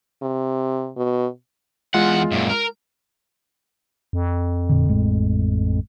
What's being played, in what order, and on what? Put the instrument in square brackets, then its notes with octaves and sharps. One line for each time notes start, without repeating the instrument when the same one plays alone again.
[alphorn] C3
B2
[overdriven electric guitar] E2 F#5 [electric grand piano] G#3 F4
[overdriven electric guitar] F#2 A#2
A#4
[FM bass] F2
[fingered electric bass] F1 A#2 D3
A1 A2 G#3